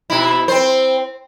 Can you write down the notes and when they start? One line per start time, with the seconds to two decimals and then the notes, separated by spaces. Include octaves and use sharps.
0.10 B2 E4
0.48 C4 C5